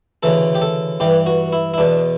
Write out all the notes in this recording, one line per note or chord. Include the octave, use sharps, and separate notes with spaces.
D2 C#3 E3 A4
G4
A4
G2 E3 G4
F#4
E4
E4
E2 B2 D4